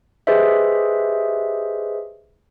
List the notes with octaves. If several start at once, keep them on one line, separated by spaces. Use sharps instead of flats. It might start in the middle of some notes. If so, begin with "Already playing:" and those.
G4 G#4 B4 C5 D#5 E5